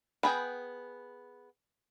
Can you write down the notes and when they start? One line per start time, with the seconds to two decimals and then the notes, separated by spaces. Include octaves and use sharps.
0.23 B3 G#4 G5 B5